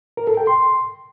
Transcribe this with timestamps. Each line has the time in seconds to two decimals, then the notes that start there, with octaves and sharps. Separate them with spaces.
0.17 A#4
0.27 A4
0.37 G5
0.47 C6